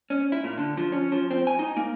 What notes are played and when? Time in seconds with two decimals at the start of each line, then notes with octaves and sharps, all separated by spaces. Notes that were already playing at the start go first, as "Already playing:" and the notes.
0.10 C#4
0.32 E4
0.44 A#2
0.58 D3
0.77 F3
0.92 C#4
1.12 F3
1.31 C4
1.47 G#5
1.59 D#4
1.77 A#3